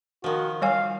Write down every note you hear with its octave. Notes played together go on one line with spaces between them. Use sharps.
D#3 F3 F#4
G3 C#5 F5 G#5